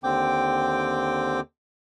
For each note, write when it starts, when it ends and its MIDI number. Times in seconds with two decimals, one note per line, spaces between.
0.04 1.40 39
0.04 1.40 50
0.04 1.40 60
0.04 1.40 79
0.04 1.40 86